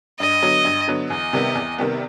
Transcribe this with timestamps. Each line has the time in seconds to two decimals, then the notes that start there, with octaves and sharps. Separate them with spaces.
0.19 G2 D#5
0.42 D3 F#3 B3
0.65 G2
0.88 D3 F#3 B3
1.10 E2 D#5
1.33 C3 D#3 G3 B3
1.55 E2
1.78 C3 D#3 G3 B3